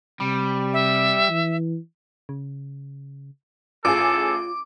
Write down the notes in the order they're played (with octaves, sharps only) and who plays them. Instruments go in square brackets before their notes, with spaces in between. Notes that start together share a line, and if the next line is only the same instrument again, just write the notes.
[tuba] C3 [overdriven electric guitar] G3
[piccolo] E5
[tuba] E3
[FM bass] C#3
[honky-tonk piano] A1 G#4 [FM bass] F4 [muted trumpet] A4 [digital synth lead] D6